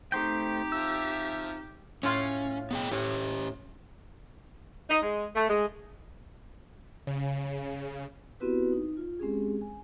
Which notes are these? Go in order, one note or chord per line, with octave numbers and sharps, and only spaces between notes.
A3 C4 D#4 G4 C5 G5 A#5
F3 E5 E6
A2 C#4 F4 F5
B3 G#4 G5
A2 C#4 G4
D#4
G#3
A3
G#3
C#3
B3 C4 E4 F#4 G4 B4
D#4
F4
G#3 C4 C#4 G4 G#4
G#5